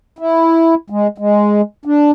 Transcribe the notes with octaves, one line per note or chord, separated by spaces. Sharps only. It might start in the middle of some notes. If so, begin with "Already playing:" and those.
E4
G#3
G#3
D4